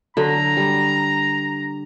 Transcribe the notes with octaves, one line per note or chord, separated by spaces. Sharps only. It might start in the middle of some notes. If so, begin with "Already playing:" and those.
D3 F#3 A#5
G3